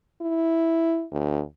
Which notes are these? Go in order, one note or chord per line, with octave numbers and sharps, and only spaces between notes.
E4
D2